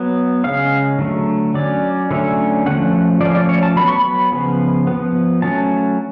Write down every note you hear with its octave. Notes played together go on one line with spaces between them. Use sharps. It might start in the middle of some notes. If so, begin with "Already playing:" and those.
Already playing: F#3 B3
C#3 G#3 C#4 F5
D3 F#3 A3
F#3 C#4 D5
D3 F#3 A3 C#4
F3 A3 C#4 F#5
F3 A3 C#4 D5
D5
C#5
A5
F#3 B3 B5
C#6
B5
C#3 F3 B3
B3
F3
F#3 A3 C#4 A5